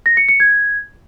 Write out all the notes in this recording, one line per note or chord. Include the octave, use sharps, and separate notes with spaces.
A#6
C#7
C#7
G#6